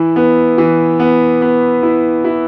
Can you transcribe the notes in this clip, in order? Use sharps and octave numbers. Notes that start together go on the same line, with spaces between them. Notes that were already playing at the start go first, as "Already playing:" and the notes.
Already playing: E3 E4
B3
E3
B3
B3
E4
E4